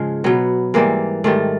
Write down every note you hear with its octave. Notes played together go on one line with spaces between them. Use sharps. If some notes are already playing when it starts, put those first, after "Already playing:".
Already playing: G#2 C#3 F3 G#3
B2 F#3 B3
G#2 E3 G3 A#3
G#2 D#3 G3 A3